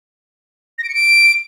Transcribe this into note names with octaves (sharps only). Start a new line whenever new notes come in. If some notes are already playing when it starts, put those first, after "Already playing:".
A#6
D7
C#7
D7